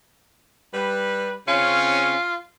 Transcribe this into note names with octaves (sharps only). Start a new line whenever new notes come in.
G3 B4
C#3 C4 C#4 F4